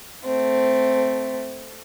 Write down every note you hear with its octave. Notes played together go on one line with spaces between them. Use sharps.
A3 C4